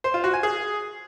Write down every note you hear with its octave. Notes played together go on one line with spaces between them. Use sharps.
C5
F4
F#4
G#5
G#4